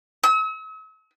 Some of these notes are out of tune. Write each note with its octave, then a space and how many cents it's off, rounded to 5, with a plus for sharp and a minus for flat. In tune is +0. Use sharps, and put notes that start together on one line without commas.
E6 -45